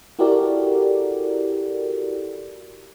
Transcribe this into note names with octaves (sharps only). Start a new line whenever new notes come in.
E4 F#4 G4 A4 A#4 D5